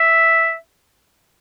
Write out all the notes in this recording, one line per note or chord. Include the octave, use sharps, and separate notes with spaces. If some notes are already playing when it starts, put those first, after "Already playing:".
Already playing: E5